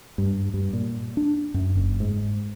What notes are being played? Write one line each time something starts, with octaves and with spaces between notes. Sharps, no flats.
G2
G2
A#2
D4
F#2
F#1
G#2